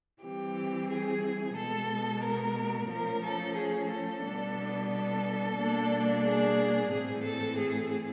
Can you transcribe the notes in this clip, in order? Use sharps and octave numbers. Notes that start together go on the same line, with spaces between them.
E3 G3 C4 G4
G#4
B2 G#3 B3 A4
A#4
F3 A3 C#4 A#4
A4
G#4
A4
B2 G3 B3 D4
A4
B2 G3 A#3 D4
G#4
A2 E3 A3 C4 G#4
A4
G#4